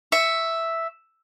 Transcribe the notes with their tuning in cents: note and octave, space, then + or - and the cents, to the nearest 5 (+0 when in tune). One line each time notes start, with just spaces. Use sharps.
E5 +0 C#6 +0